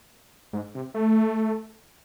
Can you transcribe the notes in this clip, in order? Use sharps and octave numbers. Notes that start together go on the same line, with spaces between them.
G#2
C3
A3